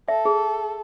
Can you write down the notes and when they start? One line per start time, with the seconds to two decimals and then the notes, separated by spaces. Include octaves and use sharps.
0.08 A4 E5
0.25 G#4